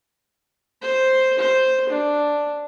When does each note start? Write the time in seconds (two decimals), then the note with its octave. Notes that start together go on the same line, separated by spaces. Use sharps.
0.82 C5
1.39 C5
1.89 D4